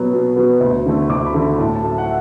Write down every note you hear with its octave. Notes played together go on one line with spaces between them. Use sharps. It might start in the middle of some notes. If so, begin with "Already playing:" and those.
Already playing: B2 F#3 B3
B2
F#3 B3
D2
D3 A3
D2 D6
B5
D3 A3
B5
A2 A5
A5
F#3 A3
A5
F#5
E5